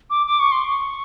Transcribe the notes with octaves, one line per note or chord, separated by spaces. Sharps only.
D6
D6
C#6
C6
C#6